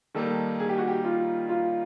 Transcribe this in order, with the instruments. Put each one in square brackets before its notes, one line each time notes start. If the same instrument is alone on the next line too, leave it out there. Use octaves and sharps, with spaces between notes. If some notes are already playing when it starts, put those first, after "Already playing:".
[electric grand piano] D#3 G3 A#3 D#4 [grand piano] A4
[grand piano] G#4
G4
F#4
G4
F4
F4